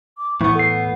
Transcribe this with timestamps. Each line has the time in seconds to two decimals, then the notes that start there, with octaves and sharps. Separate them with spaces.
0.18 D6
0.41 A2 E3 B3 C#6
0.55 A4 F#5 C7